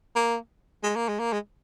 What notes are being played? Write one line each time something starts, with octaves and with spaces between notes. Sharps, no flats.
A#3
G#3
A#3
G#3
A#3
G#3